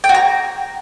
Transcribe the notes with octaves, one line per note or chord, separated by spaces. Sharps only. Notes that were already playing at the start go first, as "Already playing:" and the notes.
G5
F#4
A#5